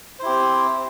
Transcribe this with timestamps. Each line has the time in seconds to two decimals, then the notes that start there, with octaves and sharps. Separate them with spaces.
0.19 C5
0.22 E4
0.25 G4
0.29 C4